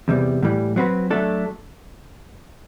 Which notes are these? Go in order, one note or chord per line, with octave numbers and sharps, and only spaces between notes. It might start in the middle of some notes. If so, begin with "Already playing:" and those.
E2 C3 G3
A2 E3 G3
F#3 C4 F#4 B4
F#3 A3 D4 A4